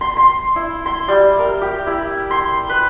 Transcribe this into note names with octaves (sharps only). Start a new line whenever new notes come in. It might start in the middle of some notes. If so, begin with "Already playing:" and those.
C6
C6
E4
C6
G3
A#4
G4
E4
C6
B4